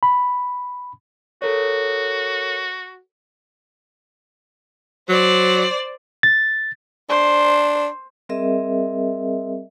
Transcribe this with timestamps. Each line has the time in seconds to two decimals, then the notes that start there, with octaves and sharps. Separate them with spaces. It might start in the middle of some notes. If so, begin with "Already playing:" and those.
0.03 B5
1.42 F#4 A4 A#4 C#5
5.09 F#3 C5 D5
6.23 A6
7.09 D4 C5
8.29 G3 C4 G#4 A#4 D#5 E5